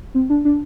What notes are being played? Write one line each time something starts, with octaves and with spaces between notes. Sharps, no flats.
C4
D4
D4